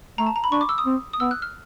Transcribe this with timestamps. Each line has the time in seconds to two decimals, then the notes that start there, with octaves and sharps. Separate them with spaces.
0.18 A3 A#5
0.26 A5
0.36 A#5
0.44 B5
0.52 D4 C#6
0.61 D6
0.69 E6
0.78 D#6
0.86 C4
1.13 D#6
1.20 B3 E6
1.31 F#6
1.42 F6